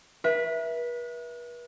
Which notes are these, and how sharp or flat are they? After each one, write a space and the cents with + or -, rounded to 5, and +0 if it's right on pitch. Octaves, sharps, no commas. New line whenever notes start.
B4 -40 E5 +0